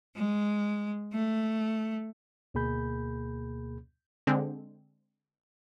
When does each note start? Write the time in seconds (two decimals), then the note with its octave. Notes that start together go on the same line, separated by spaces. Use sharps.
0.15 G#3
1.12 A3
2.54 D2 B2 A#3 G#4 B5 G6
4.27 D3 G#3 C4